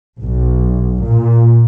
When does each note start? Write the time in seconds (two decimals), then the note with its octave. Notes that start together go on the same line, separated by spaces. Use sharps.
0.22 B1
1.04 A#2